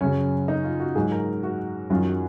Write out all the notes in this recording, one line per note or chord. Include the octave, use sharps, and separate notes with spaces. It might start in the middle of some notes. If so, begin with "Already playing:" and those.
F#2 C#3 F#3 C#4
D#4
F4
F#4
G#2 F#3 G#4
A#4
F#4
F#2 D#3 F#3 F4
F#4